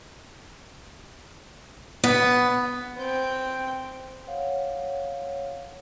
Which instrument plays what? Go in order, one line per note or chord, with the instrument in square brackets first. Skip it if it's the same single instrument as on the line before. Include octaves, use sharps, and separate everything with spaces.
[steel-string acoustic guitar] B3
[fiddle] C4 G5
[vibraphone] C#5 F5 F#5